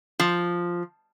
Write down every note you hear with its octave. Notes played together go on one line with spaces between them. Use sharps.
F3